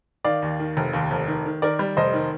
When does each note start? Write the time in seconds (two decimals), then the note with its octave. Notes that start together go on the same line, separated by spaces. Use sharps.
0.24 D#3 D5 F5
0.42 D#2
0.60 D#3
0.77 F1
0.93 D#2
1.11 F1
1.28 D#3
1.46 D#3
1.62 D#3 A#4 D5
1.79 G3
1.97 F1 C5 D#5
2.14 D#3